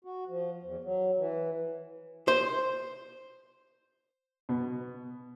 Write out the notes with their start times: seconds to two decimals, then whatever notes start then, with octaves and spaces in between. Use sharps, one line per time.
0.05 F#4
0.28 F3
0.63 E2
0.84 F#3
1.18 E3
2.28 C5
4.49 B2